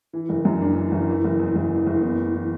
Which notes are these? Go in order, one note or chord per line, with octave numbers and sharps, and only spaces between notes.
E3
F#1
F#2
D4
E3
F#1
E3
F#1
E2
F#1
E3
F#1
B3
A2
E3